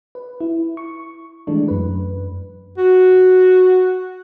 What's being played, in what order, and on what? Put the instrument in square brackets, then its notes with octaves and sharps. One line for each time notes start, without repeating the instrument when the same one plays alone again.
[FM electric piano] B4
E4
C#6
E3 G#3 A3 D4
F#2 B4
[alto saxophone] F#4